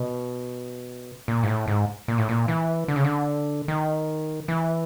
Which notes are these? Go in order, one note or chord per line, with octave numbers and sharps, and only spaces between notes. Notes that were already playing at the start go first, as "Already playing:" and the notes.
Already playing: B2
A#2
G#2
A2
G#2
A#2
A2
A#2
E3
D3
C#3
D3
D#3
E3